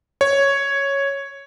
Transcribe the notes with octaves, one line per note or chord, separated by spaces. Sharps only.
C#5